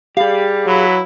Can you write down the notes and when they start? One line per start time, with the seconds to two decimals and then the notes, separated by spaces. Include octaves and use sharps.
0.17 G3 G4 G#4 F5
0.66 F#3 E4 B4 B5